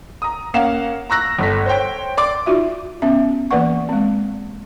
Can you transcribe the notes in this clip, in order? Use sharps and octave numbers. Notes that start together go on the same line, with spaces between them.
A#5 D#6
A#3 C#4 F5 F#5 E7
A#5 C#6 E6 F#6 A#6
G1 A4 B6
C5 C#5 G5
D5 C6 D6
D#4 F4 F#4 E5
B3 C#4 E5
E3 A#3 B4 D5 F#5 C#6
G#3 C4